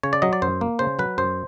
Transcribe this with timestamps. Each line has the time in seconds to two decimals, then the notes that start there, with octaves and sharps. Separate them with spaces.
0.03 C#3 C#5
0.13 D5
0.22 F#3 D#5
0.33 D5
0.42 F#2 C5
0.61 A#3
0.79 C#3 C5
0.99 F#3 B4
1.18 F#2 C5